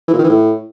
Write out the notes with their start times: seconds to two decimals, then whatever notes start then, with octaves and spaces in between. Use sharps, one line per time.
0.08 E3
0.13 A#2
0.19 D#3
0.24 E3
0.29 A2